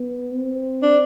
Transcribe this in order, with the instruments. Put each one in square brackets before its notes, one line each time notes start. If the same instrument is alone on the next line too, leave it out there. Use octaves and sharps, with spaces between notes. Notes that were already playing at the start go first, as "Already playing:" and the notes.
Already playing: [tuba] B3
C4
[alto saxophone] D4